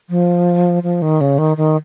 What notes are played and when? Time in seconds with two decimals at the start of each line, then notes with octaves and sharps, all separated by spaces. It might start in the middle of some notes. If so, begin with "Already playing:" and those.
0.10 F3
0.83 F3
1.02 D#3
1.21 C#3
1.38 D#3
1.57 D#3